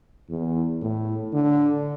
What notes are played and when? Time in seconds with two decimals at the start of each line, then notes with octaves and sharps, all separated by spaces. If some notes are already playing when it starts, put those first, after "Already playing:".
0.29 E2
0.81 A2
1.33 D3